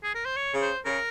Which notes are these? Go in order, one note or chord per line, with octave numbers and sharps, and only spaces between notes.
G#4
A#4
C5
C#5
C#3
C5
C#3 A#4